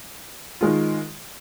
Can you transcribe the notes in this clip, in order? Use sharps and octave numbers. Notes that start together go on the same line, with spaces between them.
D#3 G#3 F4